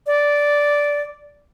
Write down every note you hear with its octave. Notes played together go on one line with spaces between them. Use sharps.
D5